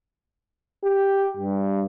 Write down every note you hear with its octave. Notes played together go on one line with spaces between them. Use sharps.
G4
G2